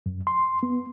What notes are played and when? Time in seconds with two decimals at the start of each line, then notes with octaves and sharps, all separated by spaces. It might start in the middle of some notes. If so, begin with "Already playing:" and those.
0.06 F#2
0.27 C6
0.63 B3